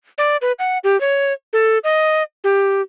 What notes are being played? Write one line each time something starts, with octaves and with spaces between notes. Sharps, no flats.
D5
B4
F#5
G4
C#5
A4
D#5
G4